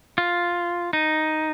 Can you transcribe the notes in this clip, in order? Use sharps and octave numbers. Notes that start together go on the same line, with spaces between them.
F4
D#4